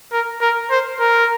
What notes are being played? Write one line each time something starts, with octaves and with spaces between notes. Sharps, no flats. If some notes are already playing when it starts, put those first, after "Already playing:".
A#4
A#4
C5
A#4